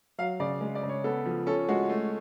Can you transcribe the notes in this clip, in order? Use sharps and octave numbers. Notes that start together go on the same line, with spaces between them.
F#3 F5
C#3 D5
G#3
D5
C#3
C#5
B3 A4
F3
C#4 A4
G#3 F#4
A3